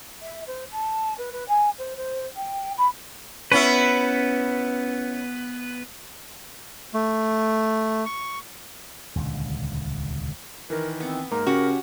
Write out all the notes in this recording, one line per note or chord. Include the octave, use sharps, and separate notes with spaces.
E5
C5
A5
B4
B4
G#5
C5
C5
G5
B5
B3 C#4 E4 B4
A3
C#6
D#1 C#2 B2 D3
D#3 E3 A#4
B3 C4
G#2 A#3 A#4 A#5
C#3 C#4 F#4 G4